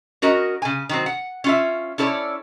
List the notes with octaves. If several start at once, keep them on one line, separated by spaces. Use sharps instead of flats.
C#4 F#4 A#4 D#5
C#3 G#5
D#3 F#3 C4
F#5
C#4 F4 E5
C#4 E4 A4 C#5 D5